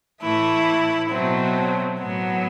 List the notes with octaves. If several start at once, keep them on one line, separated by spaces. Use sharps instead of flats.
A2 E3 A3 E4
B2 F#3 A3 C4
A2 F#3 B3